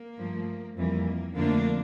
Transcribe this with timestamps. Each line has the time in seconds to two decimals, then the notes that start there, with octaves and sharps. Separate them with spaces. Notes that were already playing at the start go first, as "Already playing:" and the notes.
Already playing: A#3
0.17 G2 F3 A3
0.76 F2 E3 G3 A#3
1.35 F2 D3 A3 A#3 D4